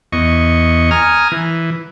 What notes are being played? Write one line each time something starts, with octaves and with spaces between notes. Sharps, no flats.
E2 D#5 C#6
G#5 A#5 D#6 F6
E3